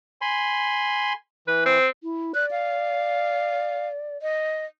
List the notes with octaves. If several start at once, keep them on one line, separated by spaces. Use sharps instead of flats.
G#5 B5 C6
E3 B4
C4
E4
D5 F#6
F5
D#5